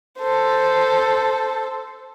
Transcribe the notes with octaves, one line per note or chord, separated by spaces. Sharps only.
A4 C5